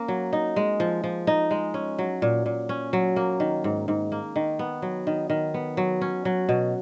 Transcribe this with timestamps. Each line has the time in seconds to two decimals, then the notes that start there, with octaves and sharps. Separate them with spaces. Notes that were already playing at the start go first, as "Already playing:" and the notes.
Already playing: A#3 C#4
0.08 F#3
0.33 D#4
0.56 G#3
0.80 F3
1.04 F3
1.27 D#4
1.51 G#3
1.74 C#4
1.98 F#3
2.22 A#2
2.46 A#2
2.69 C#4
2.93 F#3
3.16 A#3
3.40 D#3
3.64 G#2
3.88 G#2
4.12 A#3
4.36 D#3
4.59 B3
4.82 F#3
5.07 D#3
5.30 D#3
5.54 B3
5.77 F#3
6.01 C#4
6.25 F#3
6.49 B2